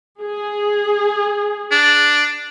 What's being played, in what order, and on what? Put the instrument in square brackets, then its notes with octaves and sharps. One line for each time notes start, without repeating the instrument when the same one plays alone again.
[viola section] G#4
[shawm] D4